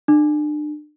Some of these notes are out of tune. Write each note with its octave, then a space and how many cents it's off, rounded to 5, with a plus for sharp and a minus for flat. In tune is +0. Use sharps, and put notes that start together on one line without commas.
D4 +35